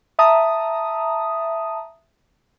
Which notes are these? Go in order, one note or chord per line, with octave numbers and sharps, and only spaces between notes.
E5 A5 A#5 D#6